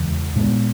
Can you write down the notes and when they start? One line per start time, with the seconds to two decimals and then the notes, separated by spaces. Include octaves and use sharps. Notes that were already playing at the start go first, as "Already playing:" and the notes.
Already playing: E2 C#3 E3 G#3
0.35 A#2 G#3 B3